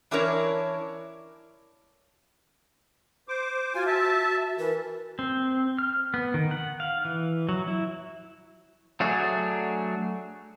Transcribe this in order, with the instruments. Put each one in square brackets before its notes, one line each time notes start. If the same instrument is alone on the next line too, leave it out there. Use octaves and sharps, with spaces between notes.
[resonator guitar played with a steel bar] E3 C#4 D4 E4 A#4 C#5
[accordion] C5 D6
[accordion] F4 G#5 [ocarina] F#4
[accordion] E5 A5
[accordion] E3 [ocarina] A#4
[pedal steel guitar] C4
F6
B3
D#3
F#5
F5
E3
F#3
E4
F#3 A3 D4 F#4 G#4